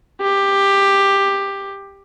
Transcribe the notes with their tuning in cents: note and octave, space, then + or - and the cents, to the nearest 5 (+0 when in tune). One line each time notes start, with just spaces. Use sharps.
G4 +10